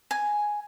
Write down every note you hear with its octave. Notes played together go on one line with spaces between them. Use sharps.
G#5